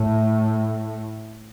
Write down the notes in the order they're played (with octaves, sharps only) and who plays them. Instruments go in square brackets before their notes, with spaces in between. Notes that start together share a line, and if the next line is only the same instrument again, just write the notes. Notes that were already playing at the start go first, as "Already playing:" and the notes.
Already playing: [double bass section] A2